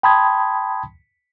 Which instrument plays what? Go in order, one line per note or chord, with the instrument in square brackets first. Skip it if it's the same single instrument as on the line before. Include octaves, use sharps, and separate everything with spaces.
[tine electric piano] G5 A5 B5 C6 D#6 G#6